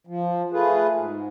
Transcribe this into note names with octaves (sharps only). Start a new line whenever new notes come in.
F3
A3 F4 G#4 B4
G#2